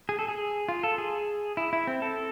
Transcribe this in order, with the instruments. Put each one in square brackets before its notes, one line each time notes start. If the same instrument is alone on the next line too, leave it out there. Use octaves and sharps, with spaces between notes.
[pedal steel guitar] G#4
A4
G#4
F4
A4
G#4
E4
E4
C4
A4